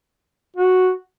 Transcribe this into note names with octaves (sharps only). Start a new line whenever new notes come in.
F#4